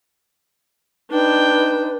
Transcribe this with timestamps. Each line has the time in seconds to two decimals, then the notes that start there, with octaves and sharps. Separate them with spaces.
1.11 D4 D#4 B4 G5